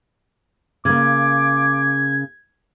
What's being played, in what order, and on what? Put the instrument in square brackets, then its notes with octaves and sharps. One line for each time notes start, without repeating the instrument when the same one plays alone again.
[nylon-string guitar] C#3 A#3 [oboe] D6 [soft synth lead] G#6